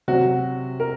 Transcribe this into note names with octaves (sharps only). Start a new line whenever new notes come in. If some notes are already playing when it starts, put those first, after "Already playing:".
C3 F#3 F#4
A#4